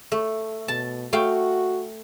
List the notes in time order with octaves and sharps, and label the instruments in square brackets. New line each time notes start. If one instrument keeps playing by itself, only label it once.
[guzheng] A3
[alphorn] B2 [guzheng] A5
[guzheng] A3 F5 G5 [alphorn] F#4